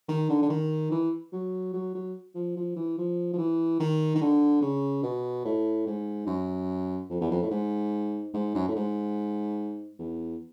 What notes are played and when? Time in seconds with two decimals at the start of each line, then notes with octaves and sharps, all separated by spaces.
0.09 D#3
0.30 D3
0.42 D3
0.50 D#3
0.91 E3
1.32 F#3
1.73 F#3
1.95 F#3
2.35 F3
2.57 F3
2.76 E3
2.98 F3
3.33 F3
3.38 E3
3.80 D#3
4.15 D#3
4.21 D3
4.62 C#3
5.03 B2
5.45 A2
5.86 G#2
6.27 F#2
7.10 F2
7.21 E2
7.31 F2
7.42 A2
7.50 G#2
8.34 G#2
8.55 F#2
8.68 A2
8.75 G#2
9.99 E2